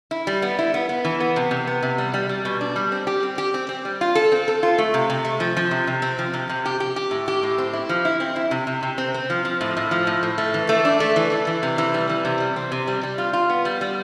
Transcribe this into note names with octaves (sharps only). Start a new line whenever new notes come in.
E4
G3
B3
E4
B3
B3
E3
B3
C3
C3
B3
C3
G3
G3
G3
B2
D4
G3
C4
G4
C4
G4
C4
C4
G3
F4
A4
C4
A4
F4
A3
C3
C3
A3
F3
F3
C3
C3
C4
F3
C3
C3
G4
G4
G4
A2
G4
A2
C4
E4
F3
E4
C4
E4
C3
C3
C3
C4
C4
F3
F3
A2
A2
F3
A2
A2
A3
E3
A3
D4
A3
E3
E3
E3
C3
E3
G3
E3
C3
G3
C4
C3
G3
G3
F4
F4
B3
G3
G3